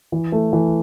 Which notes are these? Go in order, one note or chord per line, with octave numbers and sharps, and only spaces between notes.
E3
A3
E3